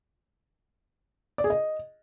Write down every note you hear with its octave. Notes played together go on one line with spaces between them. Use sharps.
D5
G#4
D#5